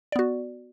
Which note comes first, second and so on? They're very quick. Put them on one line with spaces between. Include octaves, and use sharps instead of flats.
D5 B3 F#4